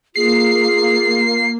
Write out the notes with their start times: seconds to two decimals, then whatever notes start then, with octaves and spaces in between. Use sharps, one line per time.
0.16 A#3 F4 G#4 C7